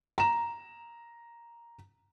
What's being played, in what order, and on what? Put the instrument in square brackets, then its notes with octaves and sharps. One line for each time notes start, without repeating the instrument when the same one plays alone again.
[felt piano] A#5 E7